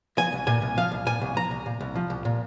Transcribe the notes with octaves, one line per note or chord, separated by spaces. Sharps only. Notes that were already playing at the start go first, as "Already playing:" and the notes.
F3 G#5
C2
A#2 G#5
C2
F3 F5
C2
A#2 G#5
C2
F3 A#5
C2
A#2
C2
F3
C2
A#2